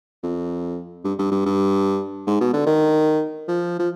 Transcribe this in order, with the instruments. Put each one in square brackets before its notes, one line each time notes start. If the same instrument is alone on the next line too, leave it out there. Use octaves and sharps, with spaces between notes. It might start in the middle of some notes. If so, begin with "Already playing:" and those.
[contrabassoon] F2
G2
G2
G2
G2
G#2
B2
D3
D#3
F3
F3